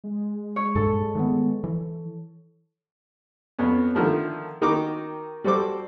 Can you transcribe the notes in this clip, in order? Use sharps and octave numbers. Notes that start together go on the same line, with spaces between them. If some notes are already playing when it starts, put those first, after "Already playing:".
G#3
C#5
G2 A#2 A4
D#3 A3 B3
E3
F2 B3 C#4
D3 D#3 F3 A3
D#3 D#4 F#4 G5 D6
G3 F#4 A4 C5 D6